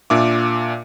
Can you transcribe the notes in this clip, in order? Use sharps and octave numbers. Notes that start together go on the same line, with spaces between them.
A#2 D4 E5 D6